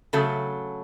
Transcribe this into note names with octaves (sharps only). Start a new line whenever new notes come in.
C#3 F#3 A3 A4